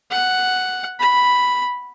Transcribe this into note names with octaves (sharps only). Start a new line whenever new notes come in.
F#5
B5